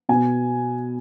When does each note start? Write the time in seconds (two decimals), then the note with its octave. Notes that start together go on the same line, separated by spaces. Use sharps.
0.09 B2 B3 G#5